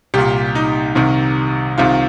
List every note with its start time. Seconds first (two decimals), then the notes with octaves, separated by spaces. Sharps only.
0.14 C2 A#2 G4
0.55 D#4
0.95 C2 C3 D#3
1.78 C2 C3 D#3 F4